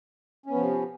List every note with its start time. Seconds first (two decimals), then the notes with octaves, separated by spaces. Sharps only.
0.46 C#4
0.50 B3
0.54 F3
0.59 C3